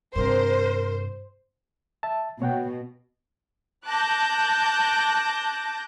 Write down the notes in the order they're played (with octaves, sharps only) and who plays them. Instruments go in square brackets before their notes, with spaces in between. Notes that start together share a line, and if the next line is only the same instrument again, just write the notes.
[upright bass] G2 C3 [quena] A#4 [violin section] C5
[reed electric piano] E5 A5
[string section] B2 [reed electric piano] C#5 F#5 G5
[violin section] A5 D6 F#6 G6 A#6